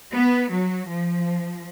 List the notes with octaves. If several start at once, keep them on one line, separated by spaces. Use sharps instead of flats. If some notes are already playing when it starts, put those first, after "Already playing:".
B3
F#3
F3